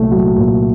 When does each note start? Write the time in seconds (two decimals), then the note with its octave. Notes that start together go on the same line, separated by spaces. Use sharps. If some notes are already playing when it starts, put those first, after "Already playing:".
Already playing: C2 A#2 F#3 A3
0.11 F#3
0.37 A#2